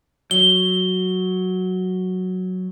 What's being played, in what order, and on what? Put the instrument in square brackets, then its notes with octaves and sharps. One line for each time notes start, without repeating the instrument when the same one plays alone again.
[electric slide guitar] F#3 [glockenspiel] G7